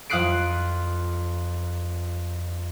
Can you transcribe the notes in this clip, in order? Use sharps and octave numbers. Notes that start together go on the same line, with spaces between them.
F2 F5 D#6 F#6 C7 D7